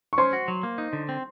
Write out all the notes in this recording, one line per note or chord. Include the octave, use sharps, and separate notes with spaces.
C#6
C#4 C5 C6
F#4
F#3
A#3
D#4
D3
C4